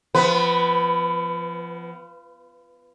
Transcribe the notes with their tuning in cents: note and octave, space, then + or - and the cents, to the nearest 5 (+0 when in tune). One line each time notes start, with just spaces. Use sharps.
F3 -20 B3 +25 B4 +0